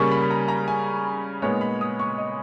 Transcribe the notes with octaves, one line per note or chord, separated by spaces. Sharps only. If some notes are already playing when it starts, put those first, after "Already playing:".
Already playing: C#3 G3 A#3 C#4 C#6
B5
B5
A#5
A#5
G#5
A#2 G#3 B3 D#4 C#5
B5
D#6
C#6
D#5